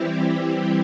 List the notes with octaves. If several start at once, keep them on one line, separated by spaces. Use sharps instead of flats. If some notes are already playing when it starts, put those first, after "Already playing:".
Already playing: E3 G3 C4 E4 G4